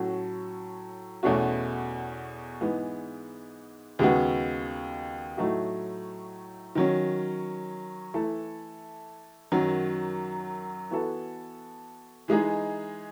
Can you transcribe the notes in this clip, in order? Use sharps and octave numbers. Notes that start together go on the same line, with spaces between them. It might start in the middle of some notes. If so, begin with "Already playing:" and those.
Already playing: A2 F#3 C#4 F#4 A4
E2 B2 A3 C#4 F#4
G#2 E3 G#3 B3
D#2 C#3 G#3 B3 F#4
A2 F#3 A3 D#4 F#4
D#3 F#3 C#4
E3 A3 E4 A4
F#2 D#3 F#3
E3 B3 F#4 A4
E3 G#3 D#4 G#4